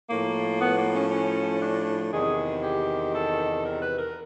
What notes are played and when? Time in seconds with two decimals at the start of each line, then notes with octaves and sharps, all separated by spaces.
0.10 A2 F3 A#3
0.61 B3
0.78 A#3
0.95 C#4
1.11 C#4
1.62 D4
2.13 E2 C3 D#3 G#4
2.64 G4
3.14 A4
3.65 A#4
3.82 B4
3.98 A#4